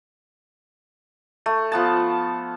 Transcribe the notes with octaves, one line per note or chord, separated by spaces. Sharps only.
A3
F3 B3 A5